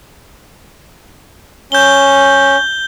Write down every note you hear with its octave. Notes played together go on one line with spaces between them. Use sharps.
C#4 G6 G7